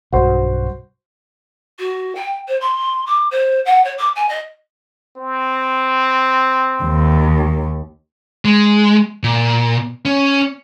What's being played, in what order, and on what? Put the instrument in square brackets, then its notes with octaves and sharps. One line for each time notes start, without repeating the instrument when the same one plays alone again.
[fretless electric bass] B1 G2 [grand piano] F#4 C5
[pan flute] F#4
G5
C5
C6
D6
C5
F#5
C#5
D6
G#5
D#5
[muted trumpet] C4
[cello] D#2
[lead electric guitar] G#3
A#2
C#4